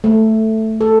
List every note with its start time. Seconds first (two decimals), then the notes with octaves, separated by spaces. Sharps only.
0.04 A3
0.81 A4